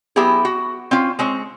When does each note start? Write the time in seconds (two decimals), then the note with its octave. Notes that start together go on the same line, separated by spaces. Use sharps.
0.16 F#3 B3 E4 G4 G#4
0.45 F#4
0.91 C4 C#4 F4
1.19 G#3 C4 C#5